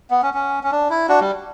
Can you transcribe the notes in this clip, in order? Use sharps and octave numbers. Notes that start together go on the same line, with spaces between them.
B3
C#4
C#4
C#4
D4
E4
D4 F#4
G3